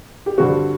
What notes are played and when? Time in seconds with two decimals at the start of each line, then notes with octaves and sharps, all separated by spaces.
0.26 G4
0.38 G2 D3 G3 C4 F#4